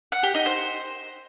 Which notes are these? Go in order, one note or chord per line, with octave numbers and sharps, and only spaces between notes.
F#5
G4
D#4
C5